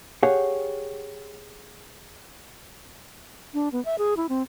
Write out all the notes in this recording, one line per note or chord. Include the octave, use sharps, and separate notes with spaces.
G4 G#4 C#5 F5 F#5
D4
B3
E5
G#4
E4
C4